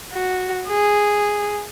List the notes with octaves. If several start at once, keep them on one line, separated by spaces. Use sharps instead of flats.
F#4
G#4